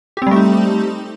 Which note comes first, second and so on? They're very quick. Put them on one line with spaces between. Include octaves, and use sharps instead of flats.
G4 C4 G3 A3 D#4